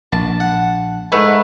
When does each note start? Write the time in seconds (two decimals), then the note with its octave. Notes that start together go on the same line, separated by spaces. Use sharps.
0.12 A#1 A5
0.40 F#5
1.12 G#2 A3 B4